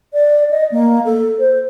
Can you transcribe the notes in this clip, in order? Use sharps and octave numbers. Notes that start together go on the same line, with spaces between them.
D5
D#5
A#3
A4
C5